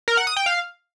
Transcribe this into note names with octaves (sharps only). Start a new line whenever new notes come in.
A#4
F#5
D#6
G5
F5